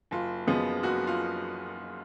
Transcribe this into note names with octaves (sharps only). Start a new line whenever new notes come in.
F#1 F4
F#2 F3 G#3 B3
F#1 F#4
F4